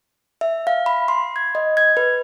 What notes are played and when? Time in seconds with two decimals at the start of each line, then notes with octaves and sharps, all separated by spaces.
0.41 E5
0.67 F5
0.86 B5
1.08 C6
1.36 G#6
1.55 D#5
1.77 G#6
1.97 B4